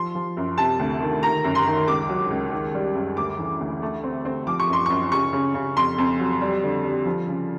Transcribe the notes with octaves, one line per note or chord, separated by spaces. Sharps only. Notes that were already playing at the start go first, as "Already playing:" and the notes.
Already playing: F3 C6
F3
F#2
C3 A5
D2
D#3
D#3 A#5
F#2
C6
D#3
C#2 D6
F#3
C#2
D#3
G3
F#2
D2 D6
E3
D2
A3
C4
C4
F3 D6
C#6
F#2
C6
F#2 C#6
C#3 C#6
C#3
C#3
F2 C6
F2
F#3
G3
D3
G3
F3
C#3